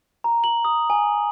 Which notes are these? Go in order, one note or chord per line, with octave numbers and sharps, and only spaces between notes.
A#5
F#7
D#6
G#5